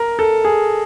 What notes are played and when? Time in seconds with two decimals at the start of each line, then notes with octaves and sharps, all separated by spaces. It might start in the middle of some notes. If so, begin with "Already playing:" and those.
Already playing: A#4
0.19 A4
0.45 G#4